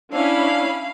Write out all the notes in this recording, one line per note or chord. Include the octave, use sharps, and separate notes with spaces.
C#4 D4 E4 F5 B5